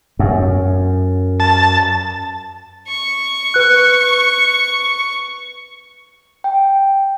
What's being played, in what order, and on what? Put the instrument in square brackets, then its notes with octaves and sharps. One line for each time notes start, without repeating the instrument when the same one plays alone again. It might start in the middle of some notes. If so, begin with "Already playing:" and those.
[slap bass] F#2
[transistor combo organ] A5
[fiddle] C#6
[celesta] B4 F#6
[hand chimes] G5